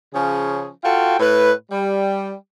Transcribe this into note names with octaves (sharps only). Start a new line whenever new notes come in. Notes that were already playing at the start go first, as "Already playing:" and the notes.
C#3 F3 C#4 G#4
F4 F#4 A4 F5 G5
A2 B4
G3